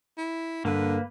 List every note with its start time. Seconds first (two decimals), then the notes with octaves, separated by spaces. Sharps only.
0.17 E4
0.65 G2 D3 A#3 A4 B4